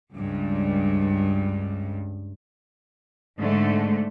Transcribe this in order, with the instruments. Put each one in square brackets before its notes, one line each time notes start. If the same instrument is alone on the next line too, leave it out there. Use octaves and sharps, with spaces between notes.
[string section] C#2 G2
[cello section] G#2 D3 G#3 A3